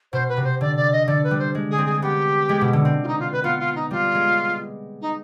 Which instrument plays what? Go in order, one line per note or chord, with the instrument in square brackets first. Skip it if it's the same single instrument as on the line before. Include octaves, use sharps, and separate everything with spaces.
[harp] B2 [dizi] C5
[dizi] B4
[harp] C3
[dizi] C5
[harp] D3 [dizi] D5
[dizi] D5
D#5
[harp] D3 [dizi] D5
[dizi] B4
[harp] G3
[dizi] C5
[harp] G#3
[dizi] G#4
[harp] C4
[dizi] G#4
[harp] B3 [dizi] G4
[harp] G#3
B2
D3
C4
[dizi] F4
D#4
F4
B4
[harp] B3 [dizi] F4
[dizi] F4
D#4
[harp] G3 [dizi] F4
[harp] G#3
[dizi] D#4